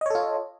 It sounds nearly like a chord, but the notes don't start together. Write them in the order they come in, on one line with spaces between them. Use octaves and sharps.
D#5 C#5 A4 F4